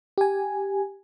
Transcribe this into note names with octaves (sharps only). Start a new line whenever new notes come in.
G4 G#5